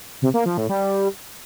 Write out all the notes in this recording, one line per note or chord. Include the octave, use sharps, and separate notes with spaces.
C3
A#3
F3
A2
G3